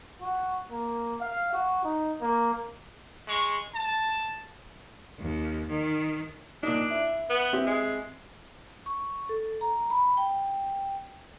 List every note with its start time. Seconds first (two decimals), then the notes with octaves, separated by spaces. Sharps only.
0.21 F#4
0.72 A#3
1.21 F5
1.53 F#4
1.84 D#4
2.22 A#3
3.27 G#3 C#6
3.74 A5
5.19 D#2
5.69 D#3
6.63 A#2 D4 D#4
6.91 E4
7.30 B3
7.53 C4 E4 G4
7.66 G#3
8.86 C#6
9.29 A4
9.61 A#5
9.90 B5
10.17 G5